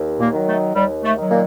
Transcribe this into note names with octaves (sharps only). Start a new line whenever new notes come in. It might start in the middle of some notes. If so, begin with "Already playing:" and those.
Already playing: D#2
A#2 A#3
D#3 F#3
A3
D#2 G3
A3
D#3
F#3
A#2 A#3